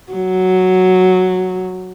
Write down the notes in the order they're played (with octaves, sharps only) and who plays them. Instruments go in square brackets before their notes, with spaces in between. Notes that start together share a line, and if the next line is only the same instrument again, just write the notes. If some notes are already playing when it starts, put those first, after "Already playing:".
[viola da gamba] F#3